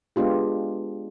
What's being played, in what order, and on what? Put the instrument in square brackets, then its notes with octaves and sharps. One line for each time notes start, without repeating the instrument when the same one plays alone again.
[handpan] G#3 B3 D4 F4 G4